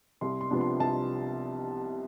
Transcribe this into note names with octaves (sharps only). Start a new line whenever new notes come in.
C2 C6
C6
C3 F3 B3 D4
C6
C2 A5